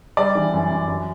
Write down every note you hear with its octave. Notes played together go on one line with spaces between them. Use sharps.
G3 D5
E3
F#2
F#2
F#2